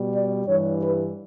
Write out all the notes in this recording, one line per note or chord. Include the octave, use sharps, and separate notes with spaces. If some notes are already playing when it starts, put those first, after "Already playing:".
Already playing: B2 G3
D5
G2 E3 G3 C#5
B4